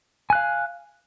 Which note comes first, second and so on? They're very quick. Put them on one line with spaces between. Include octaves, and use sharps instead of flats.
G#5 F#6 F5